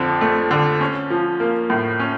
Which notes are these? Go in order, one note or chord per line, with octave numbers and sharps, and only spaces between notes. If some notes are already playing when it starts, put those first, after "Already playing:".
Already playing: F2 D3 F3
A3
D3
C#4
F3
A#3
A2
C#4